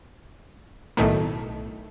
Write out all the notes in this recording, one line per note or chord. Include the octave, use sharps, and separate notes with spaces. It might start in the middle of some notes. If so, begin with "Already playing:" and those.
B1 A2 D#3 A3